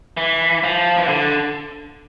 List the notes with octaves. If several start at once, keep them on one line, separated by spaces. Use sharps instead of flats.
E3
F3
E3
D3